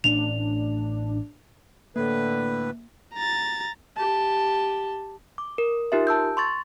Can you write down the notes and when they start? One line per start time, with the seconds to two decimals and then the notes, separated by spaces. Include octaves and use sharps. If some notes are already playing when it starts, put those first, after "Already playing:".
0.04 A1 A2 C#4 D4 F7
1.96 A2 D3 A#3 B4
3.14 A#5 A6
3.97 G4 A5
5.38 D6
5.58 A#4
5.92 D#4 F4 G4 A#4 E5
6.07 A5 E6 G6
6.37 C6 C#6 A6